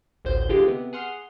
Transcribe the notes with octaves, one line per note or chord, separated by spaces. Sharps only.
A1 D2 C5 G6
D3 E3 G#3 F4 G4
C3 B3
G#4 F#5 C6 F6